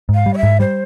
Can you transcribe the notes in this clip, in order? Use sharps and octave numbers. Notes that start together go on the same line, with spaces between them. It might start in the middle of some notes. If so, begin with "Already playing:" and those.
G#2
F5
G3
C#5
E5
G#2
G3 C5